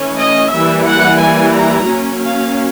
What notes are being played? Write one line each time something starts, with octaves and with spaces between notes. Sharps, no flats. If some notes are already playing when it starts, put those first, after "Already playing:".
Already playing: E3 A3 C#4
D#5
E3 G3 A#3 E5
F#5
G#5
A#5
F#3 A#3 C#4
F5